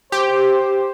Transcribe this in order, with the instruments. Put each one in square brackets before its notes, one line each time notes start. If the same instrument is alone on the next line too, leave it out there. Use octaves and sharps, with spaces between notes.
[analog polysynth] G4 [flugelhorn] C5